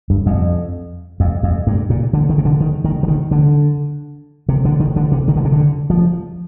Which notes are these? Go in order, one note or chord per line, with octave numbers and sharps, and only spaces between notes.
G2
F2
F2
F2
G2
A#2
D3
D#3
C3
D3
D#3
D#3
D3
D#3
D3
C3
D3
D#3
D3
C3
D#3
D3
C3
D3
F3